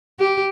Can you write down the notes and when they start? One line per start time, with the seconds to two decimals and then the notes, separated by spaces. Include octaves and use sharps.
0.19 G4